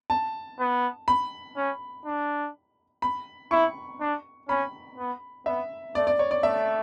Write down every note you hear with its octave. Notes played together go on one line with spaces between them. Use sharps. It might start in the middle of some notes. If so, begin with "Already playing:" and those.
A5
B3
B5
C#4
D4
B5
E4 C#6
D4
C#4 B5
B3
B3 E5
A3 D5
D5
C#5
D5
A3 E5